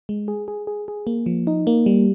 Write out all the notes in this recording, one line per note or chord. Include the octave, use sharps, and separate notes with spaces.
G#3
G#4
G#4
G#4
G#4
A#3
F3
D#4
A#3
G3